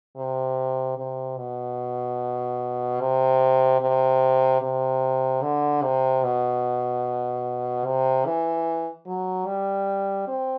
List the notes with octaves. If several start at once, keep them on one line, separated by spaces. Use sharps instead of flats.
C3
C3
B2
C3
C3
C3
D3
C3
B2
C3
E3
F#3
G3
C4